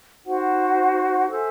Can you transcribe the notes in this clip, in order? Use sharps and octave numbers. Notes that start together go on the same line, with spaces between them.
D#4 F#4 C5 F#5
A4 C5 E5 G#5